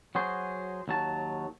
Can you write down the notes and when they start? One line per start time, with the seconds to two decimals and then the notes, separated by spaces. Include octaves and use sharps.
0.15 F#3 F#4 G#4 C5
0.88 D#2 F#3 A5